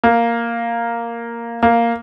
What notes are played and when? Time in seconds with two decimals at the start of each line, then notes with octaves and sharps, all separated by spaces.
0.04 A#3
1.63 A#3